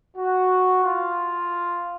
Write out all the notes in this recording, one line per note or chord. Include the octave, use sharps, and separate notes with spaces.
F#4
F4